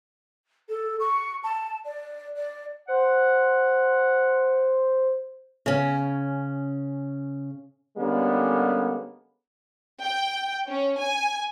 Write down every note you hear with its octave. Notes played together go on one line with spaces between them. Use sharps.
A4
C#6
A5
D5
D5
C5 F#5
C#3 C#4
D3 G3 G#3 A#3 B3 C#4
G5
C#4
G#5